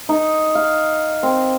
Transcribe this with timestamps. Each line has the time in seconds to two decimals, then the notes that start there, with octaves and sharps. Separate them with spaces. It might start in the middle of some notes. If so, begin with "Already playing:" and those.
0.09 D#4
0.55 F5
1.23 C4